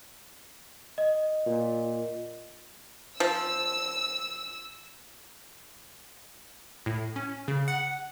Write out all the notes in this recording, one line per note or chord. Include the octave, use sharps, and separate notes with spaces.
D#5
A#2
F3 E6
A2
C#4
C#3
F#5